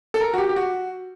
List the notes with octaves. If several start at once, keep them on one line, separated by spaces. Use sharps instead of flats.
A4
A#4
F#4
G4
G4
F#4